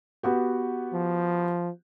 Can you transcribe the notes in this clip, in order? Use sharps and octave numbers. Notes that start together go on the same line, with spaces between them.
B3 F#4 G4
F3